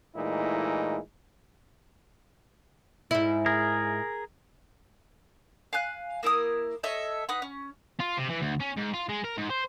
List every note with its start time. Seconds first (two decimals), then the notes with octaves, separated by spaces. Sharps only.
0.16 A#2 E3 G#3 A3 D#4 E4
3.11 G#2 E4
3.46 G#4 A#4
5.73 F5 G#5 F#6
6.23 A#3 E4 A#4 D#6
6.83 A4 C#5 D#5 E5
7.29 D#4 B4 F#5 B5
7.42 C#4
8.00 F4
8.18 C3
8.30 E3
8.42 D2
8.61 C#4
8.77 G#2
8.94 F4
9.09 G#3
9.24 A#4
9.37 G#2
9.50 C5